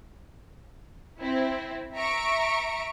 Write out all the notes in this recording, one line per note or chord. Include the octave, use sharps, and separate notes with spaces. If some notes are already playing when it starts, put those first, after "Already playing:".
C4 E4
E5 A#5 C#6 D7